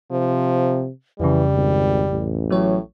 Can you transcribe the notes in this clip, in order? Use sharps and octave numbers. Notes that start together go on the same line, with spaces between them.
C3 F3
F2 C#3 E3 G3
G#1
A1
A2 F#3 C#5